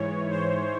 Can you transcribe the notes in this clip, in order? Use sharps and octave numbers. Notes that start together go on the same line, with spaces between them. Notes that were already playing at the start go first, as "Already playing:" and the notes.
Already playing: G#2 E3 C#5
C5